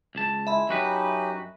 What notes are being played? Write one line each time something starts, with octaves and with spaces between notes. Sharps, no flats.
C#2 A5
G#3 E4 E5 B5
F#2 C#4 D#4 F#4 G4 B4